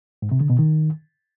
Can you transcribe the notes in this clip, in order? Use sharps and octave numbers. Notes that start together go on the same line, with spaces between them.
G#2
C3
D3
B2
D#3